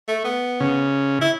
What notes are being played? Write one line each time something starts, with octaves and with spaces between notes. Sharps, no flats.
A3
B3
C#3
E4